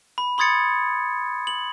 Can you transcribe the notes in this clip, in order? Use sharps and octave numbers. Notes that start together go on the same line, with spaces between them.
B5
B5 C6 D#6 G#6 A6 C#7
F#7